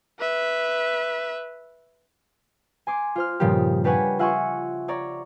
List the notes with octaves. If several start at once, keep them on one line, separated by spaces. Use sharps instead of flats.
B4 E5
G#5 C6 D6
F4 C5 F6
G2 A#2 C#3 F3 D#4 G4
D4 G4 B4 C#5 F#5 G#5
F4 E5 F#5 G#5 C6 C#6
C#5 D5 A#5